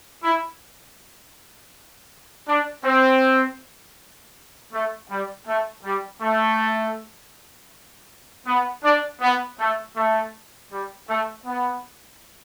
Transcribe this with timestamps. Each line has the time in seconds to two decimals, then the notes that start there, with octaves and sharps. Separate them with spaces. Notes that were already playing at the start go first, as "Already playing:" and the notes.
0.22 E4
2.47 D4
2.84 C4
4.72 A3
5.09 G3
5.46 A3
5.84 G3
6.22 A3
8.46 B3
8.84 D4
9.21 B3
9.59 A3
9.96 A3
10.71 G3
11.08 A3
11.46 B3